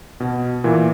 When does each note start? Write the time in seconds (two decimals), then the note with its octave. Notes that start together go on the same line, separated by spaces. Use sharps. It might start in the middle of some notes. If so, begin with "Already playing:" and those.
0.20 B2
0.64 A#2 E3